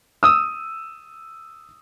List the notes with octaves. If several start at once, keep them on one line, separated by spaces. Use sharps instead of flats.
D#6 E6